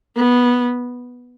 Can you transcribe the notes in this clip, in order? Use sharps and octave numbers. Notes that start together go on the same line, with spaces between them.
B3